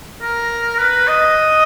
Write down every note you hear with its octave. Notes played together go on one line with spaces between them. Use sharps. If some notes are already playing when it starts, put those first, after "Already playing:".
A#4
B4
D#5